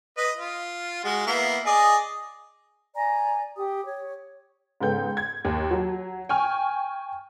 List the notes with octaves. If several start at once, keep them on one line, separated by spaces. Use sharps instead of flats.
B4 D#5
F4
G#3 F#4
A#3 B3 E4
G#4 D5 D#5
D5 G#5 A#5
G4 D#6
C#5
G#2 C#3 B3 A4 G5 G6
G#6
D#2
F#3
G5 G#5 C#6 F6